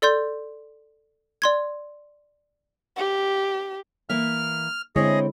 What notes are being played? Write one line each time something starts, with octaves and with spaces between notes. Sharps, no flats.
A4 D5 C6 G6
D5 C6 G#6
G4
E3 A#3 E5 F6
D3 G#3 C4 E4 G#4 C#5 D#5